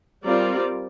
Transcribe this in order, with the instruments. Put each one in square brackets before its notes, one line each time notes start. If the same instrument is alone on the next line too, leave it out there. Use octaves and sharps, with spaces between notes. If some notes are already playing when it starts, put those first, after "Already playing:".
[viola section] G3 C4 F4 A#4 D5